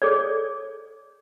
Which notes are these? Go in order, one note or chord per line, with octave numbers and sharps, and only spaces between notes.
G#4 A4 C#5 D5